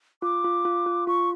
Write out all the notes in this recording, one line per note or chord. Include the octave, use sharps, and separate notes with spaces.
F4 D6
F4
F4
F4
F4 C#6